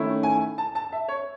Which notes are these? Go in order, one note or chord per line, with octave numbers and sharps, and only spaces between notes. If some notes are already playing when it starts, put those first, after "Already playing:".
Already playing: D#3 A3 C#4 E4
G#5
A5
A5
E5
C#5